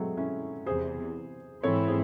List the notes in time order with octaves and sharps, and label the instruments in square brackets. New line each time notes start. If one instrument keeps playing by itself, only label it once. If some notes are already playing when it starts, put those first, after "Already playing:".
Already playing: [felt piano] F#3 G#3 A3 C4
C#4 E4
[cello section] E2 C3 E3 [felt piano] G#4 C5
[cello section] G#2 E3 C4 E4 [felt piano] A4 C#5
[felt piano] G#4 C5